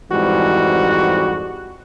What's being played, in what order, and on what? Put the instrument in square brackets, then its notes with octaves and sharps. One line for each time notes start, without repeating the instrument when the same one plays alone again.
[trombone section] F2 G#2 E3 G3 G#3 F#4